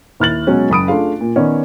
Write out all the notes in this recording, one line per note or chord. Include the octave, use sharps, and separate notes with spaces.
D#2 E4 F6 F#6 A6 F#7
B2 F#3 G#3 C#4
F#1 B5 D#6 D7
A3 D4 F4 G#4 F5
A#2
D#3 B3 C#4 C#5 D5